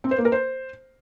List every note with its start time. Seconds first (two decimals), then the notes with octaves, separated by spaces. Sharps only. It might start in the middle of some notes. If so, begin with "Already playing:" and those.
0.04 C4
0.11 C5
0.18 A#3
0.25 A#4
0.32 C5